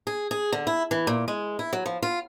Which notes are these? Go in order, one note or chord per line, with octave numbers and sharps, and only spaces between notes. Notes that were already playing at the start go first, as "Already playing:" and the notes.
G#4
G#4
D3
E4
E3
A#2
G#3
E4
F#3
F3
F4